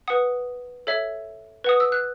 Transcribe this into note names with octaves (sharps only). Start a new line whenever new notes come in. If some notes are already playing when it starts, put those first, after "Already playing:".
B4 F#5 D#6
A4 C#5 E5
B4 F#5 D#6
E6
F#6